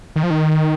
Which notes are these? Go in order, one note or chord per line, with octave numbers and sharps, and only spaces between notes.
D#3
F3
D#3